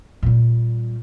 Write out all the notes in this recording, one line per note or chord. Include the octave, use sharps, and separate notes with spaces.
A#2 G3